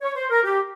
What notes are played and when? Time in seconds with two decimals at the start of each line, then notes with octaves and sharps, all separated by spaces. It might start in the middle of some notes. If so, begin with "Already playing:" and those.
0.02 C#5
0.16 C5
0.30 A#4
0.44 G4